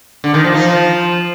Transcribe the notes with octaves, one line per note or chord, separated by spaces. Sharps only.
D3
D#3
F3
D#4
F3